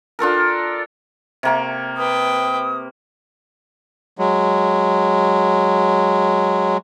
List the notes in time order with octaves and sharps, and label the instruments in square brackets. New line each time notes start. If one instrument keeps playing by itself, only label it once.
[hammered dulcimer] D4 F4 A4 A#4
C3 A#3 C#6
[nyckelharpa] B4 G5 [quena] D#6
[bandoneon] F#3 G#3